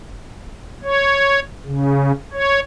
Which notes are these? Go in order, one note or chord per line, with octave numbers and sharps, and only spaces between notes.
C#5
C#3
C#5